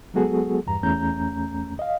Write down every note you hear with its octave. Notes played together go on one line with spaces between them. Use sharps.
F#3 G#3 B3 F#4 G#4 A4
E2 G2 A#5
E2 A3 C#4 A#5 G6
D#5 F5